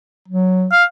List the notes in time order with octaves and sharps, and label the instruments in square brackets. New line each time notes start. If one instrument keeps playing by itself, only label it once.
[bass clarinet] F#3
[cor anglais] F5